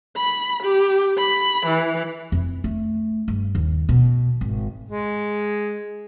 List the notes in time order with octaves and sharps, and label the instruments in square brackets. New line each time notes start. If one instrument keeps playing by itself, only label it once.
[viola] B5
G4
B5
E3
[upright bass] F2
A3
G2
D#2
B2
G#1
[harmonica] G#3